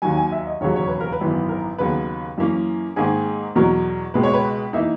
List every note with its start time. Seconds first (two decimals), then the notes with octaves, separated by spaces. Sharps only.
0.02 D#2 D#3 F#3 G#5
0.17 G#5
0.32 E5
0.47 D#5
0.61 E1 D#2 C#3 F#3 C#5
0.76 C#5
0.88 B4
1.00 A#4
1.12 B4
1.21 G#1 F#2 E3 B3
1.49 A#4
1.78 D#2 C#3 F#3 B3 B4
2.38 F#2 E3 A#3 C#4
2.96 G#2 D#3 A#3 G#4
3.55 E2 B2 F#3 A#4
4.14 C#2 B2 G#3 B4
4.23 C#5
4.34 B4
4.73 E3 A#3 D#4 E5